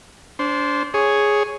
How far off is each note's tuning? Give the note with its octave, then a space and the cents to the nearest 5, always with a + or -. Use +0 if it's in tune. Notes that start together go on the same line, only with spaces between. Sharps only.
D4 -30 C5 +0
G#4 +0 C#5 +0